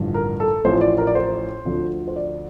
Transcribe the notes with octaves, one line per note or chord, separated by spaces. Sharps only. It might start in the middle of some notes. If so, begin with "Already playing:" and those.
Already playing: A1 G2 D3 F3
A#4
A4
A1 A2 F3 C5
D5
A#4
D5
C5
D2 D3 F3
C5
D5